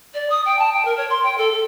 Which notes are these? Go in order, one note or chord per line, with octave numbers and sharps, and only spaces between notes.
D5
D#6
G5
A5
G5
A#4
C#5
C6
G5
A4
A4